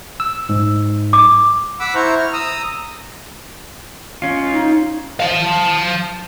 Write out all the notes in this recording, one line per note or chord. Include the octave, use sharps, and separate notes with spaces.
E6
G#2
D6
F#5 B5 D6 E6
E4 C5 A#5 C#6
F6
A#5 D#6 E6
C#4 F4
D#4
F5 A5